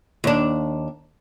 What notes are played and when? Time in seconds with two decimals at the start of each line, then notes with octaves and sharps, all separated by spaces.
0.24 D#2 D4